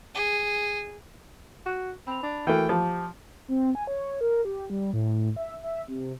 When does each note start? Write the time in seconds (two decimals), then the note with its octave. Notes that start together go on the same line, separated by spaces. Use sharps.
0.14 G#4
1.66 F#4
2.07 C4 B5 F7
2.23 D4
2.47 E3 A3 F#4 A#4 G5 F6
2.69 F3 G4 A5
3.48 C4
3.75 G#5
3.87 C#5
4.21 A#4
4.45 G4
4.70 G3
4.93 A2
5.36 E5
5.63 E5
5.88 C3